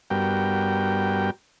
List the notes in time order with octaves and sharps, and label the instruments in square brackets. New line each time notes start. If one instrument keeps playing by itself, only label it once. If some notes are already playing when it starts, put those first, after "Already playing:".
[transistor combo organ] G2 G3 B3 F#4 A#4 G5